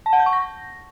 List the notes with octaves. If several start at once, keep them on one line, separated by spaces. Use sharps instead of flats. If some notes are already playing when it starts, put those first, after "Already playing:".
A5
F#5
G6
C#6
A#6